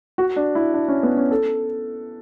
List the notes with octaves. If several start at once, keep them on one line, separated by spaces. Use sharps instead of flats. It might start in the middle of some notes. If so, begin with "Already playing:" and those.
F#4
D4
E4
D4
C#4
B3
C#4
A4